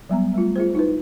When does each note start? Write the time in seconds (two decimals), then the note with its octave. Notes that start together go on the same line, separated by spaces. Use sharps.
0.10 F#3 G3 B3 A#5
0.34 G3 A3 F4
0.56 F4 G#4 C5
0.75 D#4 E4 B4